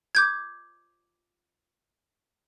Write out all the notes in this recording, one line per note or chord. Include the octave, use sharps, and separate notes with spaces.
D6 G6 G#6